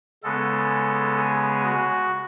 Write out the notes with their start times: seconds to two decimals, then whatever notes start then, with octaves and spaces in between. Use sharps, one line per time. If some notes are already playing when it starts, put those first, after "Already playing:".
0.23 C#3 G#3 B3 A4
1.15 G#4
1.63 F#4